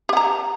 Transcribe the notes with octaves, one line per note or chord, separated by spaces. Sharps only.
G4 F#5 A#5